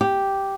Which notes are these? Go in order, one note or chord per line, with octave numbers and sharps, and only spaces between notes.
G4